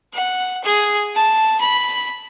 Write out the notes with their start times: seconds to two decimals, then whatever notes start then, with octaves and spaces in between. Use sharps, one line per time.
0.13 F#5
0.64 G#4
1.16 A5
1.61 B5